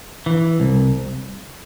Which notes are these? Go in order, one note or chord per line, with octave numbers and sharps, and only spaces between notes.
E3
C2